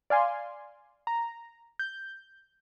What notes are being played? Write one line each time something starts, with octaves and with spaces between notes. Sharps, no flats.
D5 F5 G#5 C6
A#5
G6